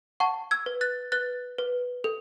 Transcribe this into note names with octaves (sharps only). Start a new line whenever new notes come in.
F#5 A5 C#6
E6 G#6
B4
F#6 A6
B4 F#6 A6
B4
A4